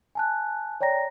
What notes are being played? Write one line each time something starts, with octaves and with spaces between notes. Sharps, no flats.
G#5 A5 F#6
C#5 D5 G5 A#5 A#6